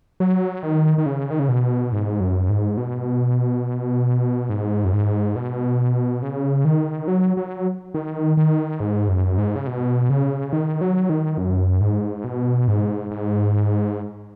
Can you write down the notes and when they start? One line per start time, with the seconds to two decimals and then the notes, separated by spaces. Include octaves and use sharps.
0.20 F#3
0.63 D#3
0.98 D#3
1.06 C#3
1.31 D#3
1.39 C#3
1.49 B2
1.92 G#2
2.20 F#2
2.49 G#2
2.77 B2
4.49 G#2
4.85 F#2
4.93 G#2
5.36 B2
6.22 C#3
6.65 D#3
7.08 F#3
7.37 F#3
7.94 D#3
8.37 D#3
8.80 G#2
9.09 F#2
9.38 G#2
9.56 C#3
9.67 B2
10.10 C#3
10.53 D#3
10.81 F#3
11.10 D#3
11.38 F#2
11.81 G#2
12.24 B2
12.68 G#2
13.11 G#2